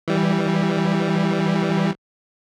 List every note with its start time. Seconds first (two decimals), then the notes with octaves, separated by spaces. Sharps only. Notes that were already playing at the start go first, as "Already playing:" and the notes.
0.08 E3 G3